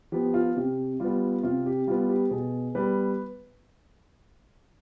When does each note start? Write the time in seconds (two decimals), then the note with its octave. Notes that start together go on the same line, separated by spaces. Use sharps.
0.12 F3 B3 G4
0.34 F4
0.56 C3 G4
1.00 G3 B3 F4
1.43 C3 F4
1.66 G4
1.87 G3 B3 F4
2.10 G4
2.31 B2 G#4
2.75 G3 B3 B4